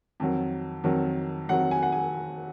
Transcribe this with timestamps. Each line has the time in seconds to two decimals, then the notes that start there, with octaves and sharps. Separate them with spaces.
0.20 F2 D#3 F#3
0.84 F2 D#3 F#3
1.48 F2 D#3 F#3 F#5
1.71 G#5
1.83 F#5
1.92 G#5